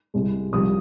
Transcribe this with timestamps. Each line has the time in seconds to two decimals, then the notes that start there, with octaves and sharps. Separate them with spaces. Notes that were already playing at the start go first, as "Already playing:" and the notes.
0.14 C2 C3 G#3
0.52 C2 C3 F3 G#3 D#6